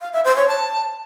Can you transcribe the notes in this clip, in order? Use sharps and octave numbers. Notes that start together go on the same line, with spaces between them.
F5
E5
C5
C#5
A5